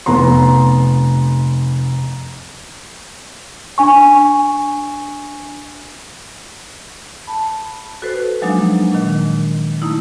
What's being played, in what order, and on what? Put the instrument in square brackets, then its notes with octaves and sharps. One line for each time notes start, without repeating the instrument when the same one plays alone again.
[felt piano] F1 B3 A#5 C6
[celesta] D4 G#5 C#6
[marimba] A5 B5
F#4 A4 B4 C5
F3 F#3 G#3 A#3 D4 D#4
A#2 D#3
A3 A#3 D#4 E4